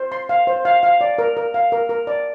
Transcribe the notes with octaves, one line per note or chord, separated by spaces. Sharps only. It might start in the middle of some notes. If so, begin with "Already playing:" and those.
Already playing: C5
C6
F5
C5
F5
F5
D5
A#4
A#4
F5
A#4
A#4
D5